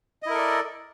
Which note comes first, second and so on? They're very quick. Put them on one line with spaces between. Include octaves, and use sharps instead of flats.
D#5 E4 A#4 A4 D5